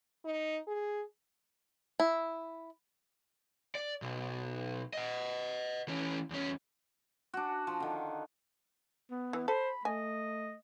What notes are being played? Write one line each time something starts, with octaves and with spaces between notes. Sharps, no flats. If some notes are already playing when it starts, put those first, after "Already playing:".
D#4
G#4
E4
D5
B1
D#5 F#5
E3 C#4
E2 C#4
D4 F#4
F3
D3 D#3
B3
E3
A4 C5 B5
A3 D#5 G#5